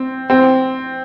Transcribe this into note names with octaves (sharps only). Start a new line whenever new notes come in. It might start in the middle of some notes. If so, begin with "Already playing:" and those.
Already playing: C4
C4